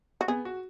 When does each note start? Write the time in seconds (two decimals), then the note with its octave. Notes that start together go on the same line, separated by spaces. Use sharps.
0.21 F#4
0.28 B3 G#4
0.45 F#4